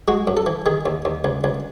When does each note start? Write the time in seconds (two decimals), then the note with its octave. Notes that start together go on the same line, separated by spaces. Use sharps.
0.08 G#3 F#4
0.27 F#2
0.37 A4
0.46 E3
0.66 D#3 G#4
0.86 D#2
1.05 D#2
1.24 C#2
1.44 C#2